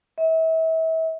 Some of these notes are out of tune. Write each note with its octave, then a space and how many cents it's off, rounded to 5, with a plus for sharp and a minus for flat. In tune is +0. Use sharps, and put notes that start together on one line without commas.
E5 -35